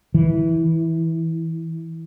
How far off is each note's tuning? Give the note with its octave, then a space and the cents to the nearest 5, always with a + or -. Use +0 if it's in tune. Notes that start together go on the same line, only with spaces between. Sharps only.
E3 -15